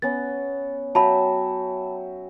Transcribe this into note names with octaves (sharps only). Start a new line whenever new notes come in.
B3 C#4 A6
F#3 E5 G5 A5 B5